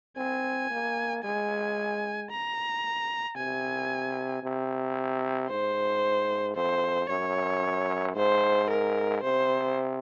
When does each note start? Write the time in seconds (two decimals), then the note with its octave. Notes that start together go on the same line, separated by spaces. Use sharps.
0.17 C4 G#5
0.71 A#3
1.23 G#3 G#5
2.31 A#5
3.36 C3 G#5
4.43 C3
5.49 G#2 C5
6.56 F2 C5
7.09 F#2 C#5
8.16 G#2 C5
8.70 A#4
9.23 C3 C5